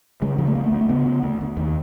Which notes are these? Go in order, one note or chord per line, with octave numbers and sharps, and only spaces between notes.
C#3 G#3
C#3 F3
A3
D2 A#3
A3
D2
A3
C#3 B3
C#3
D2
D2
D#2